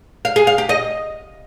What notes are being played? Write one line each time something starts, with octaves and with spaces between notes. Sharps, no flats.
F5
G#4
F5
G4
D#5